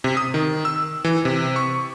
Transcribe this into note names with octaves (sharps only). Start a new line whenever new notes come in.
C3
D#6
D#3
E6
E3
C3
C#6